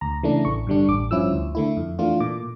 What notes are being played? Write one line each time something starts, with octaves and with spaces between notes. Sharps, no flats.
D2 A#5
C#3 E3 A3 D4
A1 C#6
G2 D3 G3 D4
A1 D6
G2 F3 C#4 E4 E6
D2
D3 A3 E4
F2
E3 A3 D4 F4
A#2 D6